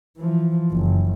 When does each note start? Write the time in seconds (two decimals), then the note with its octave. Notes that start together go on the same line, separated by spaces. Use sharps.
0.18 E3 F3
0.72 F#1